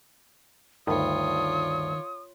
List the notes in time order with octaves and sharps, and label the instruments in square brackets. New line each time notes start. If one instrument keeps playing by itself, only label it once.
[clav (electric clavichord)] D2 G2 [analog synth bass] D#3 [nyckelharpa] F4 C#5 [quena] D#6